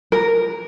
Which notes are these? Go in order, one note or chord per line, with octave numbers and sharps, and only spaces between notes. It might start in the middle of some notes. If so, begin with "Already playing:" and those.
A#4